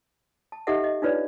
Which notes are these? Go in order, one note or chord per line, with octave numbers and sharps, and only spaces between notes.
A5
D#4 G4 A4 D#5 E5 F#5
D#5
D4 D#4 F4 B4 C#5 D5